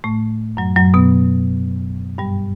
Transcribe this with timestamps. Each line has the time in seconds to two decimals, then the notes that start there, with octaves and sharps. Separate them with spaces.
0.04 A2 A3
0.57 F#2 F#3
0.76 F#2 F#3
0.94 B2 B3
2.18 G2 G3